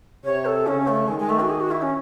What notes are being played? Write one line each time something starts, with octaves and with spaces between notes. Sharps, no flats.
C3 C#5
A4
C#3 C#4
A3
D#3 G#3
G#3
A3
F#4
G#4
F#4
E4
C#4